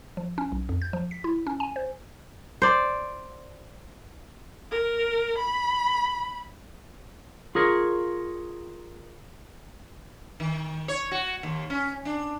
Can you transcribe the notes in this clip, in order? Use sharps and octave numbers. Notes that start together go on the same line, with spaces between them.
F3
C#4
B1
F2
G6
F3
B6
E4
C#4
G#5
C5
C5 D5
A#4
B5
F4 G#4 A#4 C#5
D#3
C#5
F#4
D#2
C#4
D4